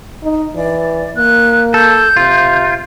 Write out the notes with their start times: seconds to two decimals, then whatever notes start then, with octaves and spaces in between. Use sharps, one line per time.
0.23 D#4
0.56 E3 D5
1.16 A#3 F#6
1.74 A4 G6
2.16 C3 F4